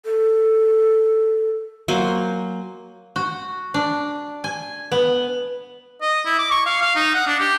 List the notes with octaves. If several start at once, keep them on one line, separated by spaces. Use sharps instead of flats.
A4
F#3 A#3 C5 G#5
F#4
D4
G#5
B3
D#5
E4
D6
C#6
F5
F5
D#4
F#5
D4
G4